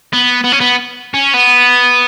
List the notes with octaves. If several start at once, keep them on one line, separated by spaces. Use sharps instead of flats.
B3
B3
C#4
B3
C#4
B3